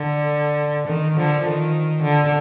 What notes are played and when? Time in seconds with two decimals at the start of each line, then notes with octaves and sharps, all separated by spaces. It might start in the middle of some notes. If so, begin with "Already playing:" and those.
Already playing: D3
0.88 D#3
1.17 D3 F3
1.46 D#3
2.03 D3